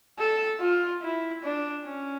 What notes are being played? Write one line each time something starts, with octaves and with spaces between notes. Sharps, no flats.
A4
F4
E4
D4
C#4